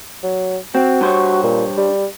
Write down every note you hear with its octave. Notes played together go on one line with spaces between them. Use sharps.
F#3
C4 F#4
G2 C5 C#5
A#2
G3